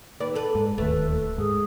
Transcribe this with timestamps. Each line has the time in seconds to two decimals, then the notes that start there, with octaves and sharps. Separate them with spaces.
0.20 D#2 B4 D5
0.35 A4 B4
0.55 G#2
0.78 D1 D#2 A3 B4
1.09 A4
1.38 G#2 G#4